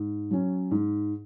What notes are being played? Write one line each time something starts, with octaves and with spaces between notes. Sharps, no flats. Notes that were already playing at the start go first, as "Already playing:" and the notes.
Already playing: G#2
F#3 C#4
G#2